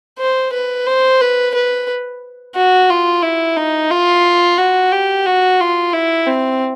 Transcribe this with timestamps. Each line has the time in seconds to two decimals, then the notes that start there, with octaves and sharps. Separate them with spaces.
0.19 C5
0.53 B4
0.86 C5
1.21 B4
1.54 B4
2.55 F#4
2.90 F4
3.22 E4
3.57 D#4
3.91 F4
4.58 F#4
4.92 G4
5.26 F#4
5.60 F4
5.93 E4
6.27 C4